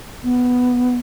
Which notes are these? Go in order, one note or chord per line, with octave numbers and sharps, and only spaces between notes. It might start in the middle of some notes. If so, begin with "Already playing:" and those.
B3